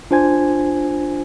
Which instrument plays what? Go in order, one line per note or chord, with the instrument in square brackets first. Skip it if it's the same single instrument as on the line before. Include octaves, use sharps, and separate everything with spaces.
[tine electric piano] D4 F4 C5 G#5 G#6